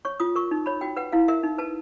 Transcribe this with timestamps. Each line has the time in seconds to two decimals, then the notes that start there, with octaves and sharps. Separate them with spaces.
0.05 C#5 C#6
0.20 F4 D#6
0.35 A#4 C#6
0.51 D#4
0.66 C#5 B5
0.81 F#4 G5
0.97 B4 F#5
1.12 E4 F5
1.28 A#4 E5
1.43 D#4
1.58 B4 A5